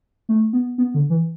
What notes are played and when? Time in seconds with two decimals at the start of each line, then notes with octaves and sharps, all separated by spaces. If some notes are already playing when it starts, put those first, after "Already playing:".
0.29 A3
0.53 B3
0.78 B3
0.94 D3
1.10 E3